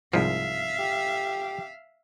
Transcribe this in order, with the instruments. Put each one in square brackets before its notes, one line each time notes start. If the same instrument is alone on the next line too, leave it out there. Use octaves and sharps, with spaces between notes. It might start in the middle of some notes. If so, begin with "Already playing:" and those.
[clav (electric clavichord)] C2 G#2 F3 [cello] E5 F5
[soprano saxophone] G4